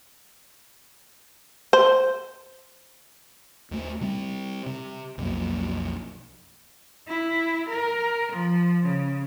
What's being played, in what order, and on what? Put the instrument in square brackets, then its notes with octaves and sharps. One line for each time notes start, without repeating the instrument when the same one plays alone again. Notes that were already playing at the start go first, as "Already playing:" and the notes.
[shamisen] C5
[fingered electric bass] D#2 A3
C3 G3 C4
C3
B1 F2 F#3 A#3
[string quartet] E4
A#4
F3
C#3